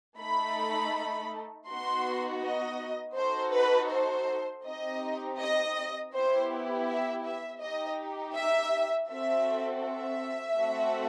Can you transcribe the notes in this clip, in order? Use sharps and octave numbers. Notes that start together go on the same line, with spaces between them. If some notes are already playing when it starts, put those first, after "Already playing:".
A3 D#4 A4 B5
B3 D#4 F#4 C6
D#5
D#4 F#4 A4 C5
B4
C5
C4 D#4 G4 D#5
D#5
B3 E4 G4 C5
E5
E5
D#4 G4 D#5
E5
C4 F#4 A4 E5
E5
A3 C4 F#4 A4